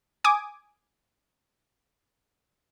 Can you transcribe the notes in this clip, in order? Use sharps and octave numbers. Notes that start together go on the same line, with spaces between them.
G#5 D6 D#6